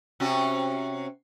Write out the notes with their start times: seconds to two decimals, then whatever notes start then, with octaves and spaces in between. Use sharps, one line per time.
0.20 C3 C#4 F#4